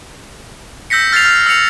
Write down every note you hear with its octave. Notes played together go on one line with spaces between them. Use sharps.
E6 G6 A#6 B6 C#7
F6 A6 B6 C7 F7
F6
E6 F6 C#7 F7